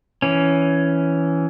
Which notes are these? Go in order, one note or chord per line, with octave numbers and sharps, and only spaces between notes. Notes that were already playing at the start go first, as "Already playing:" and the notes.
E3 C#4